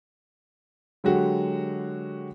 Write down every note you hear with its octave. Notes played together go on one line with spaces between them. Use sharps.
D3 F#3 G#3 F#4 G4